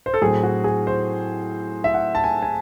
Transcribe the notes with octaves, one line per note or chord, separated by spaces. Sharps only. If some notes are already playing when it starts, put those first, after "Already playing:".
C5
A4
A2 F#3 C4 G#4
F#4
G#4
C5
E5
F#5
A5
G#5
G#5